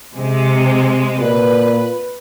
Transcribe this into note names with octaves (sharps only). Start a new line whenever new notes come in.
C3 G#3
A#2 B4